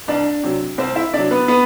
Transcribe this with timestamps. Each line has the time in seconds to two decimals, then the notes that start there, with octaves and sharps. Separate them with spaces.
0.08 C2 D4 D5
0.43 C3 F#3
0.78 C2 C4 C5
0.95 E4 E5
1.13 C3 F#3 D4 D5
1.31 B3 B4
1.48 B3 B4